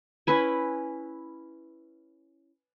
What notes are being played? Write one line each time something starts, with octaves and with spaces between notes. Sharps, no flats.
C#4 E4 B4 G#5